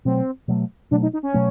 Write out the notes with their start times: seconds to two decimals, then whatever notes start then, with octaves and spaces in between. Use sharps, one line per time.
0.05 B2 F#3 A3 C4
0.48 B2 F#3 A3
0.91 B2 F#3 A3 D4
1.02 D#4
1.13 D#4
1.23 C#4
1.34 B2 F#3 A3